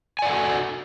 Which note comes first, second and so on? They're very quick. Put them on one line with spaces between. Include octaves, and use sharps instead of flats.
G#5 D5 F#5 A4 F#4